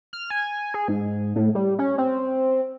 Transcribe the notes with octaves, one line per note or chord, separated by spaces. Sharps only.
F6
G#5
G#4
G#2
A2
G3
C#4
C4